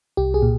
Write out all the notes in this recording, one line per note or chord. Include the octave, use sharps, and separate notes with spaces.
C2 G4
G#4
A#2